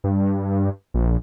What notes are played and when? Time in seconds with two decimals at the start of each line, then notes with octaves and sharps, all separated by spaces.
0.04 G2
0.94 A#1